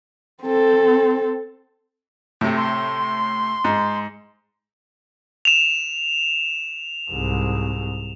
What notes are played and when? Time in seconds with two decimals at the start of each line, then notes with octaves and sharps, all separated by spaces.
0.42 C4 A4
2.41 A2 C3
2.57 C6
3.64 G#2
5.45 E7 F7
7.11 C2 G#2